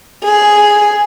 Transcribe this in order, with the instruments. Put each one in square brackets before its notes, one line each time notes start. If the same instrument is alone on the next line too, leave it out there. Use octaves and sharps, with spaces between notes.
[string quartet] G#4